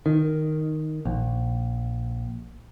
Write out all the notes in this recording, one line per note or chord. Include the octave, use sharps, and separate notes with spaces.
D#3
A#1